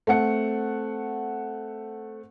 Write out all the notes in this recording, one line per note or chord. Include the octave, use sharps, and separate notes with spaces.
A3 C4 F#5 C#7